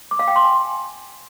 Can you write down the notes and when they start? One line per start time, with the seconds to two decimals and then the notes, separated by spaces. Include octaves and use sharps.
0.11 D6
0.19 F5
0.28 G5
0.36 C6
0.44 G#5